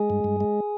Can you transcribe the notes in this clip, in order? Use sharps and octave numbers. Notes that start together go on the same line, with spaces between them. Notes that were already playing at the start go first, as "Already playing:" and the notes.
Already playing: G#3 G#4
G2
G2
G#3